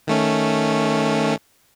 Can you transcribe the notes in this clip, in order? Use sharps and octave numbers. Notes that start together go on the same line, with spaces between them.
D#3 A3 C#4